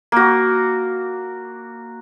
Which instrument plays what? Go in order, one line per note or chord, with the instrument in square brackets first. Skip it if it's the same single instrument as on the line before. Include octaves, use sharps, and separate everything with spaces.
[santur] A#3 F#4